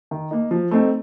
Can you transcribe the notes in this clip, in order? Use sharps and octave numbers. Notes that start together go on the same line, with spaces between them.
D#3
A#3 D#4
F3
A3 C4 D#4